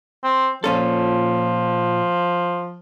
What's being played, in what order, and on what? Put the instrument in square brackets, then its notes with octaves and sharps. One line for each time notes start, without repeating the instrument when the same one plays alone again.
[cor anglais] C4
[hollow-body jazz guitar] A#2 C#4 A4 [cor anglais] F3